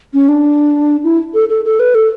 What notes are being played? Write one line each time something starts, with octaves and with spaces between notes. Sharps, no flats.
C#4
D4
E4
A4
A4
A4
B4
A4